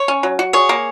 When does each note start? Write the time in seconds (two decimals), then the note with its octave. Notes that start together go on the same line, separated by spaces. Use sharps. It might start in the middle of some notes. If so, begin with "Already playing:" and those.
Already playing: C#5
0.08 C#4
0.23 F#3
0.39 F#4
0.53 G#4 C#5
0.69 A#3